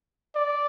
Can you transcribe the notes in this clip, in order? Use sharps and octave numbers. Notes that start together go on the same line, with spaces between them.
D5